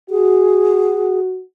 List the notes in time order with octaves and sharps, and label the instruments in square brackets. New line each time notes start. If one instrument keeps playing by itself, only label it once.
[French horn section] F#4 [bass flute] G#4